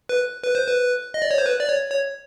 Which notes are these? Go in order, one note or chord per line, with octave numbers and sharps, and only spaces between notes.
B4
B4
C5
B4
D#5
D5
C#5
C5
B4
D5
C#5
C#5